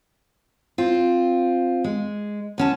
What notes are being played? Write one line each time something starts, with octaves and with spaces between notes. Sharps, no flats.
C4 F4
G#3
D2 C#4 A5